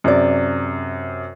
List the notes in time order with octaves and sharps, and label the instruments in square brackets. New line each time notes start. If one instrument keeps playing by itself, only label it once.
[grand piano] F#2 C3 [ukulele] G#4 D5